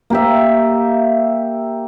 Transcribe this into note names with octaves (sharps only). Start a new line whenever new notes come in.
A#3 G4 E5